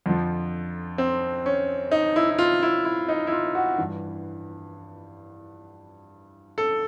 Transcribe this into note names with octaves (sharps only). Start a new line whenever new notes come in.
F2 D3 F3
C4
C#4
D#4
E4
E4
F4
E4
E4
D#4
E4
F4
F#4
G2 E3
A4